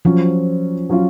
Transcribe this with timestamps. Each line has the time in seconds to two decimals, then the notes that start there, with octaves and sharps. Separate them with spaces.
0.05 F3 F#3 C#4 F4
0.90 F#3 C#4 F4